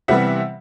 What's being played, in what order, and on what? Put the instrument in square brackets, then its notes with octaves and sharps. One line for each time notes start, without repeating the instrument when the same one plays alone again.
[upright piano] C3 E3 G3 B3 E5 F#5